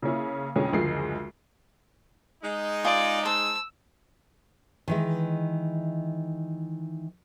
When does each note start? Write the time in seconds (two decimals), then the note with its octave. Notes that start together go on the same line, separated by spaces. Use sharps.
0.02 C#3 A#3 C#4 E4
0.56 F2 B2 D3 G#3 C#4
0.73 F#1 D2 F3 G#3 C7
2.44 G#3 D#4
2.84 F4 G#4 D5 D#5
3.25 C5 A5 E6
4.88 D#3 E3 G#3